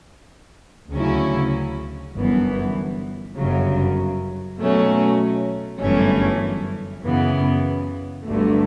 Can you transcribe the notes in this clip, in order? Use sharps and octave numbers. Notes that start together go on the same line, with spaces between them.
D2 C#3 F#3 C#4 E4
G1 F#2 E3 B3
G1 F#2 C#3 F#3
B2 F#3 A3 C#4
G1 F#2 E3 A3 C#4
F#2 C#3 E3 B3
G1 G2 D3 F#3 A3